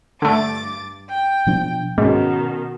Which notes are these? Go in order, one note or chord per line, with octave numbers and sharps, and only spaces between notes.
G2 D3 A3 D6 A6
G5
B2 F3 D4
G#2 B2 D#3 C4 C#4